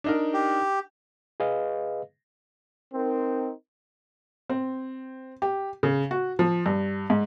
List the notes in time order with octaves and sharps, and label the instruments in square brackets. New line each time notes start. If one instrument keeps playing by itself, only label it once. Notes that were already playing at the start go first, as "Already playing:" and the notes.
[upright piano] D4 D#4 A#4
[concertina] G4
[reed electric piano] G#4 B4 D#5 F5
[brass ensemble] C4 D#4 A#4
[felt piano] C4
G4
C#3
F#4
F3
G2
G#2